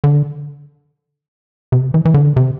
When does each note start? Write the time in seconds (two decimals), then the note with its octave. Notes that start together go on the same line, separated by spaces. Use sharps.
0.04 D3
1.72 C3
1.94 E3
2.05 E3
2.14 D3
2.36 C3